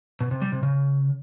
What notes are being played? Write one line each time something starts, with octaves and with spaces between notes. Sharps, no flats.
B2
C3
G3
C3
C#3